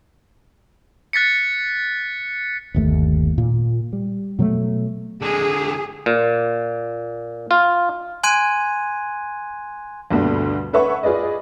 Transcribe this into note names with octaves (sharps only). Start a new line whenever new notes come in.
F#6 A6 B6 C#7
G1 D#2 A3
A#2
G3
B2 F#3 G3 A3
D3 G#3 G#4
A#2
F4
G#5 C6 F#6 G#6 D#7
D2 G2 B2 D3 A3
A4 B4 C#5 E5 F#5 C#6
F4 G#4 B4 D5 D#5